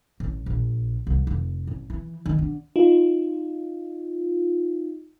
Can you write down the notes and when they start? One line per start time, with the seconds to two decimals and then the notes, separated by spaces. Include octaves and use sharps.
0.20 A1
0.46 A#1
1.07 C2
1.27 F1
1.67 A1
1.90 E3
2.26 D#3
2.39 D3
2.76 D#4 F4